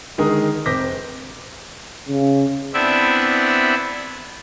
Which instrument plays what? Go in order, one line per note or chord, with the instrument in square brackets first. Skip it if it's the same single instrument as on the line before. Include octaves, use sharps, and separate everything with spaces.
[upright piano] D3 D#3 G#3 D#4 G#4 A#4
F1 C4 D6 G6 A#6 B6
[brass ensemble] C#3
[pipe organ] B3 C4 D4 E4 D5 E5